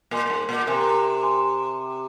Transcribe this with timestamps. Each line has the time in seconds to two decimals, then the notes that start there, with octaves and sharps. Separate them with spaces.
0.11 A#2 A#4 G#5 C6
0.26 A#2
0.30 G#2
0.49 A#2
0.67 C3 A#4 G#5 C6
1.23 G#5 C6